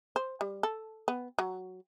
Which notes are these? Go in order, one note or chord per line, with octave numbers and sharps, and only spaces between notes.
C5
G3
A4
B3
F#3